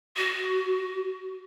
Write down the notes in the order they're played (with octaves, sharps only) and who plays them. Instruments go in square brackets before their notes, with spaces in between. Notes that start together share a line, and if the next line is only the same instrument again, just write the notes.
[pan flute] F#4